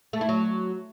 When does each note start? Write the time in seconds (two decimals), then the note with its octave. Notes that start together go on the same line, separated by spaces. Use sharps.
0.13 A3
0.21 E4
0.29 F#3